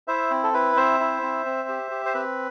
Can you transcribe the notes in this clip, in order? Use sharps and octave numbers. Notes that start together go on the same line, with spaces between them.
E4 C5 E5
C4
A4
E4 B4
C4 C5 E5
E4
C4
C4
G4
G4
C5
C4 B4